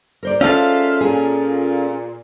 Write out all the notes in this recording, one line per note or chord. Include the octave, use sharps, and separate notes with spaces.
A#4 C5 D5
G#3 C#4 F4 A4 E5 F5
A#2 G#4